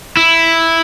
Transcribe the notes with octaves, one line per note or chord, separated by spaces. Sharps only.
E4